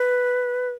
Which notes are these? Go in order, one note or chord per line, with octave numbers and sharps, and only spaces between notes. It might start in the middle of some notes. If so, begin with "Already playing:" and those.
Already playing: B4